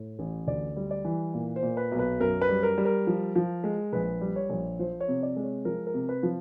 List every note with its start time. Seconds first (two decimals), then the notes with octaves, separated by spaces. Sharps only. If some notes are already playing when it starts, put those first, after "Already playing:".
Already playing: A2
0.19 A1
0.47 D2 D5
0.76 G3
0.91 D5
1.05 E3
1.34 A#2
1.56 C5
1.62 A#2
1.77 B4
1.92 B1
1.99 B4
2.20 F#2 A#4
2.41 B4
2.49 G3
2.63 A#4
2.78 G3
2.85 A#4
3.07 F3
3.35 F3
3.64 G#3
3.93 A#1 B4
4.21 G3
4.36 C#5
4.50 A#1
4.79 F3 C5
5.00 C#5
5.08 C3
5.23 D5
5.36 G#3
5.43 C#5
5.65 F3 A#4
5.87 A#4
5.94 C3
6.09 B4
6.23 F3